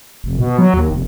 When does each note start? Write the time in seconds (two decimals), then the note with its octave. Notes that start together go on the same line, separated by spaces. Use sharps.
0.24 F1
0.39 B2
0.58 F#3
0.74 D#2
0.91 F1